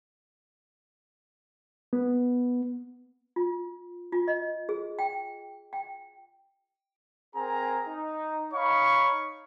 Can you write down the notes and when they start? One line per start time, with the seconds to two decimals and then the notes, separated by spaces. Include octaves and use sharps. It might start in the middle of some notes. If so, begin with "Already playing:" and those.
1.93 B3
3.36 F4
4.12 F4
4.28 D#5
4.69 G#4
4.99 G5
5.73 G5
7.35 C4 G#4 A#4 G#5 A#5
7.87 D#4
8.53 D#4 C#5 F5 B5 C#6